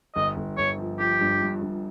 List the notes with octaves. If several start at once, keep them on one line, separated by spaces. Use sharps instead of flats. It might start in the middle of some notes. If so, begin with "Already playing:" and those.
G1 D#5
G1
G1 C#5
F3
F3 G4
G2
G2
G2